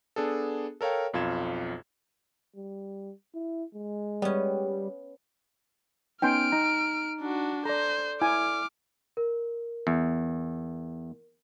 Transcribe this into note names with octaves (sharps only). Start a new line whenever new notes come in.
B3 D4 G#4 A4
A4 A#4 C#5 F5 G5
B1 F2 F4 G#6 E7
G3
E4
G#3
G3 B3 C#4
B3 C#4 D#4 G5 G#5 C6 F6 D7
D#4 A#5
D4 F#4
A4 C5 D5 A#5
E4 G#5 D6 F6
A#4
E2